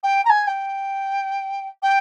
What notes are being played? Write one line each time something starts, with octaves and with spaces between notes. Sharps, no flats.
G5
A#5
G#5
G5
G5